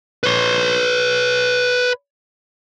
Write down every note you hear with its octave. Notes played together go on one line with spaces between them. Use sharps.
B4 C#5